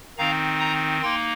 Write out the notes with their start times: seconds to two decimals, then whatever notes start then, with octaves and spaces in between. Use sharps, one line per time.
0.18 D#3 C4 D#4 F5 A#5
0.60 A#5 D#6
1.02 A#3 D#4 G5 C6